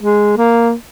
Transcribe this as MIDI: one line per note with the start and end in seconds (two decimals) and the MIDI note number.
0.01 0.34 56
0.37 0.73 58